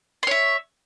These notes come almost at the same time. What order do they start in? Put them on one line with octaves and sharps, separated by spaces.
C6 C#5 E5